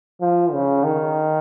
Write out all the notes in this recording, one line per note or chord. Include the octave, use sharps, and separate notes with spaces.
F3
C#3
D#3